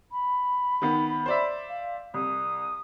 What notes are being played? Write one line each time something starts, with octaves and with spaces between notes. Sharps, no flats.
B5
D#3 B3
C5 D5 E5
F5
C2 D#6